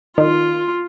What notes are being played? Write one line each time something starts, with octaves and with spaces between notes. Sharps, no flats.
D#3 F4